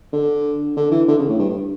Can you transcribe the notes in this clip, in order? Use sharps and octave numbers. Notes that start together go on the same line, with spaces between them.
D3
D3
E3
D3
C#3
A2
G2
G2